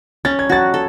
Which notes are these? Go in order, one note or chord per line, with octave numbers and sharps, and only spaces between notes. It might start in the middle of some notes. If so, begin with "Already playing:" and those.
C#4 A6
G#6
F#4 A6
A4